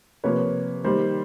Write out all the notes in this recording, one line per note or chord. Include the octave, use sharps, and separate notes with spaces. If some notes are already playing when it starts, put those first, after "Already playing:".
C3 F3 A#3 B4 C#5
D#3 G3 A#3 A#4 C5